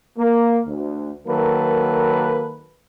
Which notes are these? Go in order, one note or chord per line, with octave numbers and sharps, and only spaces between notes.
A#3
D2
D#3 F#3 A#3 A4 B4